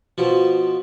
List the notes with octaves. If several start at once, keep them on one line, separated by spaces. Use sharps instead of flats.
B2 F3